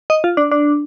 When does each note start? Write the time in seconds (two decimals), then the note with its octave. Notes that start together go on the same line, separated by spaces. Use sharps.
0.10 D#5
0.24 F4
0.37 D4
0.51 D4